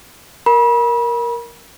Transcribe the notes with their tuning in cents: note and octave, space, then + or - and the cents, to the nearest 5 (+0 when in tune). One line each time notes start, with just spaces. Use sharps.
A#4 +5 B5 -35